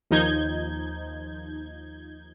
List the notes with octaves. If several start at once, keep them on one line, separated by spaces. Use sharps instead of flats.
D#2 F3 D#4 G6 G#6